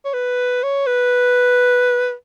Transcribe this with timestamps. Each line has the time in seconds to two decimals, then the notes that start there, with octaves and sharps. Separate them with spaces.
0.05 C#5
0.13 B4
0.63 C#5
0.87 B4